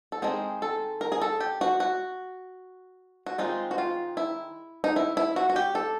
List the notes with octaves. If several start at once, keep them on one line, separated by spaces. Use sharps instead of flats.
A4
D#3 G#3 C4 G#4
A4
A#4
G#4
A4
G4
F#4
F#4
F#4
D#3 G#3 C4 D#4 F4
F#4
F4
E4
D#4
E4
E4
F#4
F#4
G4
A4